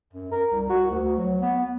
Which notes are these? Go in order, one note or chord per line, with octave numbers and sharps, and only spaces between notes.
F#2
A#4
C2
F#4
D2
F#3
B3